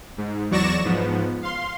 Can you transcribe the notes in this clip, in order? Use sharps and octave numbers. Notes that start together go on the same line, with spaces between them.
G#2
E2 F#3 D5 C#6 A#6 E7
G#2 F3 B3
F5 C6